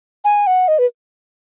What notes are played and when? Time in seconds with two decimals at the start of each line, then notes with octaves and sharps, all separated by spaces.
0.24 G#5
0.47 F#5
0.68 D#5
0.79 B4